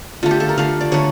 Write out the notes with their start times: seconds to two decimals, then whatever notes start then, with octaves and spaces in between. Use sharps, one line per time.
0.23 D3 A3 F4
0.31 G4
0.40 A4
0.49 A#4
0.58 D3 A3 F5
0.81 D5
0.92 D3 A3 C#5